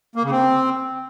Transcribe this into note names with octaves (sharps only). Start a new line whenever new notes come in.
A#3
C#3
C4